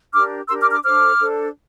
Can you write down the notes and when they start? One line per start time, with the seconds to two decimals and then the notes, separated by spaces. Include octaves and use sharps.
0.13 D4 G4 A#4 D6 F6
0.48 D4 G4 A#4 C6 E6
0.60 D6 F6
0.71 D6 F6
0.83 D4 A4 C5 D6 F6
1.20 D4 A4 C5